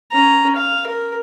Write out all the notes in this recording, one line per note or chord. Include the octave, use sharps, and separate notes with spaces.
C#4 A#5
F5
A#4